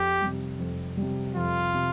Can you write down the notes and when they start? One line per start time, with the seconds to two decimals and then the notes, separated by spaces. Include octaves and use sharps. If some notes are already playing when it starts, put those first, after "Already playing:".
Already playing: F2 G4
0.22 C3 G3
0.59 F2
0.97 C3 G3
1.36 F2 F4
1.74 C3